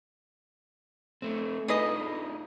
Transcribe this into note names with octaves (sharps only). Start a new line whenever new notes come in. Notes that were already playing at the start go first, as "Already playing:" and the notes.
A3 C4 A4
D4 D#4 F4 G#4 B4 D#5